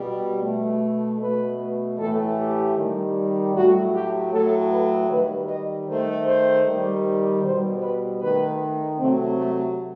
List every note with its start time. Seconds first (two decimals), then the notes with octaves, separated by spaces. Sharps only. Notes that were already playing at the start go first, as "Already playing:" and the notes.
Already playing: B2 G3
0.43 B2 A3
1.20 B2 A3 B4
1.98 A2 E3 A3 A4
2.38 G4
2.76 D#3 G3
3.55 A2 F#3 A3 F#4
3.93 G4
4.32 A2 F#3 A3 A4
4.70 B4
5.09 D#3 G3 B4
5.49 D#5
5.87 D#3 A3 C5
6.26 C5
6.66 D#3 G3
7.44 B2 G3 C5
7.82 B4
8.21 D#3 A3 B4
8.98 C3 F#3 A3 C4
9.38 A3